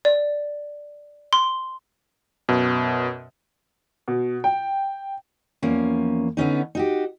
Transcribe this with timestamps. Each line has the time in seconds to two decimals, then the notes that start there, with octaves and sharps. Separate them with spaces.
0.05 D5
1.33 C6
2.49 F#2 B2
4.08 B2
4.44 G5
5.62 E2 F3 A#3 C#4
6.37 D3 B3 C#4 D#4
6.75 D#4 F#4 G4